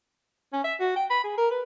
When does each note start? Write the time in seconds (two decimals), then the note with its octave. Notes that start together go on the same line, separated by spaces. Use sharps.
0.53 C#4
0.64 E5
0.80 F#4
0.96 G5
1.10 B5
1.24 G#4
1.37 A#4
1.51 B4